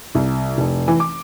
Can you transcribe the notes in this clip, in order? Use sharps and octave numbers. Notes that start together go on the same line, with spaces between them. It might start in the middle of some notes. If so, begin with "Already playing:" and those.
C2
F1
E3
D6